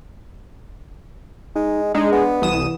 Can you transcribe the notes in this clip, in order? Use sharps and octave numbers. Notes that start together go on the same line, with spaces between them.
G#3 D#4
G#3 D4 D#4
B3
C2 E3 D#6 E7